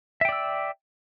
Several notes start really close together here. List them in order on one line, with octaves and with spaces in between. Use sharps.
E5 G5 D5 E6